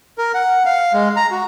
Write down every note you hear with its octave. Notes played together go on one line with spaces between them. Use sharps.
A#4
F#5
F5
G#3
A#5
F#4